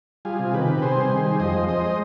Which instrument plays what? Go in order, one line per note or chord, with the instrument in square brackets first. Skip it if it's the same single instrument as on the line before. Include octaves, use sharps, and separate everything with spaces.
[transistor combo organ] G3 F4 G#4
C3
D#3 G4 B4
C3
C3 G#4 C5
G3
D#3
G3
F2 C5 D#5
G#3
G#3 C5 D#5
C5